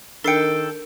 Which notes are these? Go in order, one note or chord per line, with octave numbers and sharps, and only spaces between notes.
D#3 D4 A4 A#4 G5 C7 C#7